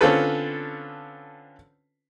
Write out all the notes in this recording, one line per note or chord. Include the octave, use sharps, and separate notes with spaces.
D3 C4 C#4 F4 A4 B4